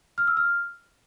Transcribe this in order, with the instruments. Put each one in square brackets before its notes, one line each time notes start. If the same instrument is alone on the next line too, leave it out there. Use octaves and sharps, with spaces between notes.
[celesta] F6
E6
F6